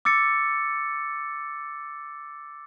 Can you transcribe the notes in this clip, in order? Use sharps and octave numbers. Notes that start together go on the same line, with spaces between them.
D6 E6 A6 C#7